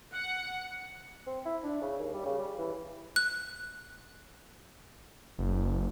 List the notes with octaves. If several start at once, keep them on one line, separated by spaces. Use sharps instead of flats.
F#5
C4
E4
D4
C#3
D#2
G3
C#3
G3
E3
F#6
F#1